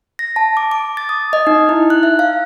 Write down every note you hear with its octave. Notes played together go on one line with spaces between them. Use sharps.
A#6
A5
D6
D6
A6
D#6
D#5
D#4
E4
F#6
E5
F5